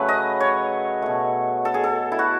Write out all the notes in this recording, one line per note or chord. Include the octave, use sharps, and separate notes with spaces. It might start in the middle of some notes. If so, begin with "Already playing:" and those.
Already playing: C#3 F#3 A3 B4
D#5
C#5
B2 A3
A4
G#4
A4
E4
F#4